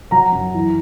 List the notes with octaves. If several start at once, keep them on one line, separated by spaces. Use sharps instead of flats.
F#3 A#5
F#2
E3